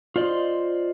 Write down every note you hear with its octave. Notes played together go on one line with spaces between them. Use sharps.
F4 C5 D5 D#5